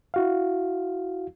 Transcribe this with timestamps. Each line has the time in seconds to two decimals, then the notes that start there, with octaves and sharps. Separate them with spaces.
0.14 E4 F#4 F5